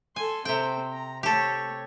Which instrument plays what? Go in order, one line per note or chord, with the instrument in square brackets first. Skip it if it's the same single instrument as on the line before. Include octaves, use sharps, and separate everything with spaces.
[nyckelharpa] A4 C6 [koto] G#5
[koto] C3 G5 [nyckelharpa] C4 A4
[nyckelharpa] A#5
[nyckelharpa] A3 C#5 [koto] G4 A4